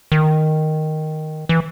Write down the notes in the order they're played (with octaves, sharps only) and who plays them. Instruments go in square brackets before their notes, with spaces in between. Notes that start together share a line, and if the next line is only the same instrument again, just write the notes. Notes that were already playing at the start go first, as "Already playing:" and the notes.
[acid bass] D#3
E3